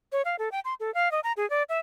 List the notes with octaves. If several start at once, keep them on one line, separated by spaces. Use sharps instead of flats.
C#5
F5
A4
G5
C6
A4
F5
D#5
A#5
G#4
D5
E5